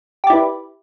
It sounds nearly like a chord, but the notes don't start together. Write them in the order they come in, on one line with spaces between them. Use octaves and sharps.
G4 D5 E4 B4